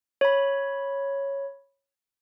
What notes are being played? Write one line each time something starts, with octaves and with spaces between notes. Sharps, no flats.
C#5 B5